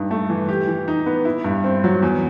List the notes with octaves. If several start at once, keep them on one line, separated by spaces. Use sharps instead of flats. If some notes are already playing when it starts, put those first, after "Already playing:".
Already playing: G2 D#4
A3
E3
G4
E3
D#4
B3
E4
G2
C4
F#3
E2